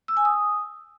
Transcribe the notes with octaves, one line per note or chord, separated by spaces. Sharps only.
E6
G#5
D#6